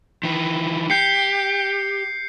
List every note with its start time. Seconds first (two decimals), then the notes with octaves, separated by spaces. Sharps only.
0.23 D#3 E3
0.90 G4 G6 C7 C#7